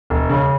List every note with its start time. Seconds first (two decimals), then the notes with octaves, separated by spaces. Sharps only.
0.10 E1
0.30 C#3